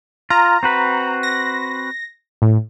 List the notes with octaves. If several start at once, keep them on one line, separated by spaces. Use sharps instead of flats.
F4 A#5
C4 F#4 B4
A#6
A2